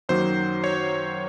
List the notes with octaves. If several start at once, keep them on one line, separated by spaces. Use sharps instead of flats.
F#2 D#3 F#3 A#3 C5
C#5